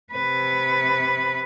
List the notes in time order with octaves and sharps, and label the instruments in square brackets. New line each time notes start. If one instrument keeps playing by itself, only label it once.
[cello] C3 B4